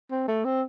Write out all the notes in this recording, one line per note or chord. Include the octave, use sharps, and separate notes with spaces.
C4
A3
C4